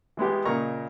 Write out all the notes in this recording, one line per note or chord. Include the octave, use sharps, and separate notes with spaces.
E3 G#3 B3 G4
A#2 C#3 A#4 D#5 A#5 C#6